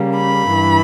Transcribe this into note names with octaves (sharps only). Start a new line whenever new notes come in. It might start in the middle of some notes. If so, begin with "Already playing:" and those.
Already playing: C#3 G3 A#3
B5
G2 E3